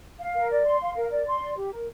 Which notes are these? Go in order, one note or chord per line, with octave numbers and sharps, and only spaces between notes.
F5
A#4
D5
C6
F5
A#4
D5
C6
D5
G4
A#4